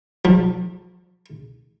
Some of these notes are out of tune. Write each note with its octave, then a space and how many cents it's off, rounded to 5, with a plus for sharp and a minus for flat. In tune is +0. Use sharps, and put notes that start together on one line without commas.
F3 +40